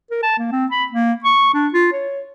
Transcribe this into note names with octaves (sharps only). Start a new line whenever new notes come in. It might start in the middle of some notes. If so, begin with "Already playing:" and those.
A#4
A5
A#3
C4
B5
A#3
C#6
D4
F4
C#5